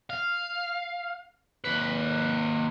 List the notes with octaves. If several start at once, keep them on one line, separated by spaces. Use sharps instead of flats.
F5
D#2 B4